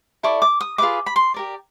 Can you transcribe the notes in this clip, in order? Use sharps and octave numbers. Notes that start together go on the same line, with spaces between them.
E4 A4 D5 C#6
D6
D#6
F4 G#4 B4 D#5 D6
B5
C6
G4 A#4 D5